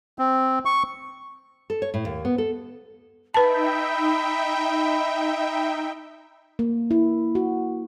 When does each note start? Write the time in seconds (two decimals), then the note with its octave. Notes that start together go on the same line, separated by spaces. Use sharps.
0.19 C4
0.65 C#6
1.70 A4
1.82 C#5
1.94 A2
2.05 D#2
2.25 B3
2.38 A4
3.34 D#4 B4 E5 G5 A5 B5
6.59 A#3
6.91 E4
7.35 F#4